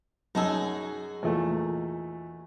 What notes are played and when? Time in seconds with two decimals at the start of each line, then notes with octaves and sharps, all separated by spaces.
0.35 F#2 D#4 F#4 G#4 A5 E6
1.23 E2 A#2 A3